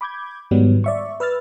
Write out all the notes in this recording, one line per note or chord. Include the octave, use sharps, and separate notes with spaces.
B5 D6 G6 G#6
G#2 D#3 F#3 G3 B3
D5 E5 C#6
B4 E6 F6 A6